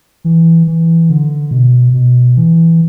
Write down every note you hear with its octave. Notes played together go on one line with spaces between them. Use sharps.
E3
E3
D3
B2
B2
E3